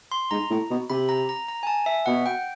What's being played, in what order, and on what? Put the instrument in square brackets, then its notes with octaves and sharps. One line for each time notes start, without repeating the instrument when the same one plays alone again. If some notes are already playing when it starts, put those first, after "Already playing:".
[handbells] C6
[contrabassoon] G#2 [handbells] A#5
[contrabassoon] A2
B2
[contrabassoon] C3 [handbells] B5
[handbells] A#5
A#5
A#5
G#5
A5
E5
[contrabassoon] B2 [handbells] F#5
[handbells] G5